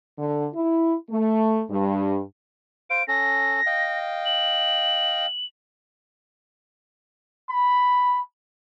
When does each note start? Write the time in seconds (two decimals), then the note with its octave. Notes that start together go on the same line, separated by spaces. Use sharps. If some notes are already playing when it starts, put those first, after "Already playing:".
0.18 D3
0.54 E4
1.10 A3
1.70 G2
2.90 C5 F5 D7
3.08 C#4 A4 A#6
3.66 D#5 F5 G5
4.26 F#7
7.49 B5